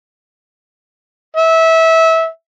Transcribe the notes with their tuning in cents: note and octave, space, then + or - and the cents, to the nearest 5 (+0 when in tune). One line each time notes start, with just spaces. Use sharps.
E5 -20